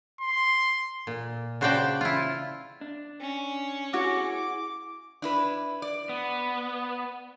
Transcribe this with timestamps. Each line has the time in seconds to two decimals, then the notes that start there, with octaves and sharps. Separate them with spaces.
0.21 C6
1.07 A#2
1.61 C#3 F#4 C5 D5 G5 A5
2.01 E4 F4
2.81 D4
3.20 C#4
3.94 E4 F#4 G#4 C#5 D6
5.22 D4 E4 B4
5.82 D5
6.09 B3